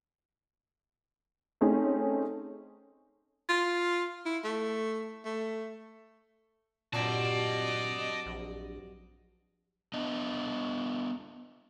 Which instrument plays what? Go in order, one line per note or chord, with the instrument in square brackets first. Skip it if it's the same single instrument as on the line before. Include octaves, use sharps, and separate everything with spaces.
[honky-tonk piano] A3 C4 C#4 D#4 G#4
[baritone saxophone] F4
E4
A3
A3
[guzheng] G2 F#3 C4 [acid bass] A#2 [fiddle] D5 [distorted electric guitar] D#5 A5
[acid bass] A#1
[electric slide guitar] B3 D4 D#5